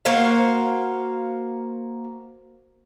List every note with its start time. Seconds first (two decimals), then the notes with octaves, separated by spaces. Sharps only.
0.05 A#3 F#4 C5 F5